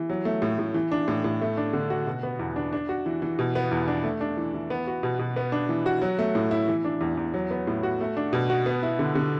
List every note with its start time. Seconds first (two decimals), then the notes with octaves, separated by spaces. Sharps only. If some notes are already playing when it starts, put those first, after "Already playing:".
Already playing: E3
0.09 F#3
0.25 A3
0.42 A2
0.59 A2
0.74 E3
0.91 D4
1.08 A2
1.24 A2
1.41 A3
1.57 D4
1.73 D3
1.90 F#4
2.07 B2
2.23 B3
2.39 E2
2.56 D4
2.73 D4
2.89 F#4
3.06 E3
3.22 E3
3.39 B2
3.55 B3
3.71 E2
3.88 D4
4.04 A3
4.21 D4
4.37 E3
4.54 E3
4.70 B3
4.87 F#4
5.03 B2
5.19 B2
5.36 B3
5.52 D4
5.69 E3
5.86 F#4
6.02 F#3
6.19 A3
6.35 A2
6.51 E4
6.68 E3
6.85 D4
7.01 E2
7.17 E2
7.34 F#3
7.51 B3
7.67 A2
7.83 F#4
8.01 A3
8.17 D4
8.33 B2
8.50 F#4
8.66 B3
8.83 E4
8.99 D3
9.15 D3